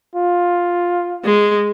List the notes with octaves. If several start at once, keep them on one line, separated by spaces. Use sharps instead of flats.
F4
G#3